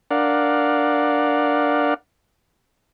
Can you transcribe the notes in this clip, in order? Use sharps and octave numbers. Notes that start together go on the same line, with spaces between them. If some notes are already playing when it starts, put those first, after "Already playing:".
D4 A#4 D5 F5 F#5